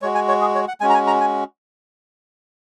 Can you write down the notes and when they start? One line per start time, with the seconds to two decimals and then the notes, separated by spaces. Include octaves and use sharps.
0.02 G#3 F#4 C#5
0.15 G#5
0.28 C#5
0.41 G#4
0.55 C#5
0.68 F#5
0.81 G#3 C#4 F#4 G#5
0.90 A#5
0.94 G#5
1.07 A#5
1.21 G#5